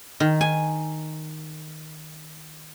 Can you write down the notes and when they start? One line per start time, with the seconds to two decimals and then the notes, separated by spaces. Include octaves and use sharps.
0.20 D#3
0.41 G#5